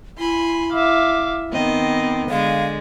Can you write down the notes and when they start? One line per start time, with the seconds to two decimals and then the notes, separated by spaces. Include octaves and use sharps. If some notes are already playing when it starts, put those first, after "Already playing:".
0.18 E4 G#5 B5 C6
0.73 E5 F5 D6
1.52 D#3 B3 C4 D#5
2.30 D3 G#3 F5